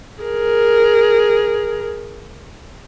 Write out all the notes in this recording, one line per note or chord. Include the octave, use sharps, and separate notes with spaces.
G#4 A#4